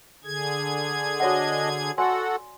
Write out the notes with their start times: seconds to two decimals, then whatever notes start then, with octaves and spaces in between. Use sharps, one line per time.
0.24 D3 G#4 G#6
1.20 D4 F#4 C#5 D#5 F#5
1.98 F#4 A4 D5 F#5 G#5 C6